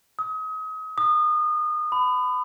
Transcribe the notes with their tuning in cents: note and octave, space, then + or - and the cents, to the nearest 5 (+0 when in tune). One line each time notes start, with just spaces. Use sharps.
D#6 +35
D#6 -30
B5 +30